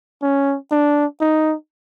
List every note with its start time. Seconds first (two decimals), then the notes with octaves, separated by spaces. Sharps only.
0.22 C#4
0.71 D4
1.21 D#4